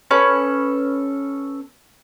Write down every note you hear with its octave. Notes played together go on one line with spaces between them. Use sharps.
C#4 A4 B4